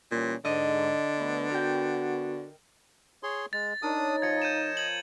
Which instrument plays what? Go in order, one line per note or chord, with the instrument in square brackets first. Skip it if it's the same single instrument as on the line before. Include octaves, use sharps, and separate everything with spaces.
[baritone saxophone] A#2 [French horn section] E3 G3 C#4
[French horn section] G#2 [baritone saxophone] D3 [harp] D#5
[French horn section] D2 A3 B3
[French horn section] B3 F#4 [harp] A#4 G5
[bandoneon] G#4 C#5 C6
[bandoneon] G#3 [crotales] A6
[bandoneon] D4 D#6 [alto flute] D#4 [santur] A#4 C#5
[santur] F3 [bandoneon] D#5 [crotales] G#6 C#7
[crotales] G6 D#7 E7
G#6 F#7